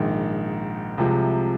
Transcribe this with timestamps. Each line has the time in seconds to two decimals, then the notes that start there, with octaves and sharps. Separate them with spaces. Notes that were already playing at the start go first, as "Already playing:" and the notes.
Already playing: A#1 G#2 D#3
0.98 C2 C3 F3 G#3